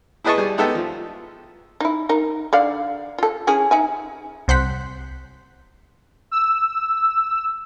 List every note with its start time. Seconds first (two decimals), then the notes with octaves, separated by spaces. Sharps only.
0.24 E4 G#4 B4 D#5 A5 C#6
0.37 G3 G#4 G#5
0.58 G#3 B3 D#4 G4 A4 E5
0.75 F3
1.80 D#4 E4
2.09 D#4 A#4
2.53 D3 D5 F5
3.18 F4 A4
3.47 C#4 E4 G#4
3.71 D#4 E5 G#5
4.48 C2 C5 F#5 B6
6.31 E6